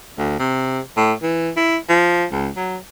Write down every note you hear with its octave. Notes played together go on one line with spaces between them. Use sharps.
D2
C3
A2
E3
E4
F3
C#2
F#3